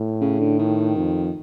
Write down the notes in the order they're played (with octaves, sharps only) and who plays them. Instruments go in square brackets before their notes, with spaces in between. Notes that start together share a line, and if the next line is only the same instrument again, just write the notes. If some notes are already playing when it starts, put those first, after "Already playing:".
Already playing: [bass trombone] A2
[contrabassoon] C#3
D3
D#3
[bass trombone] F2